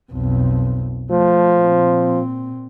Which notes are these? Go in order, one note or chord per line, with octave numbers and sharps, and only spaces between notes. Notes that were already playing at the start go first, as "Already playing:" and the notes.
B1 F2
F3 A3
A#2 C4